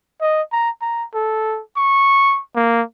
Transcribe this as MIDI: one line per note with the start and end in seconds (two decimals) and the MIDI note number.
0.21 0.42 75
0.52 0.70 82
0.81 1.04 82
1.14 1.60 69
1.76 2.40 85
2.56 2.82 58